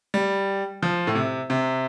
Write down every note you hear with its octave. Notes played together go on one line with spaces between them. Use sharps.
G3
F3
A2
C3
C3